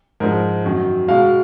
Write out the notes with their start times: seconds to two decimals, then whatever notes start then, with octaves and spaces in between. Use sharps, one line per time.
0.20 G#2 F3 G#3 A#4
0.65 F#2 D#3 F#3
1.08 B2 G#3 F5